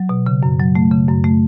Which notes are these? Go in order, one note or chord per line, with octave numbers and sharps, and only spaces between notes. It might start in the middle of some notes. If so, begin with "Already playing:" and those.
Already playing: F#3
B2
C#3
F#2
F#3
A3
C#3
F#2
A3